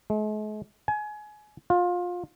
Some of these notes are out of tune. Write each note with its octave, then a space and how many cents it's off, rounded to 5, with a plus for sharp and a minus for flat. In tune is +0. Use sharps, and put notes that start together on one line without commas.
G#3 +45
G#5 +25
F4 +25